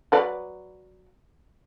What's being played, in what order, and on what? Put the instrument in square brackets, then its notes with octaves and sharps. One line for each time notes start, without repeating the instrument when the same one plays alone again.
[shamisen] F#3 B4 D5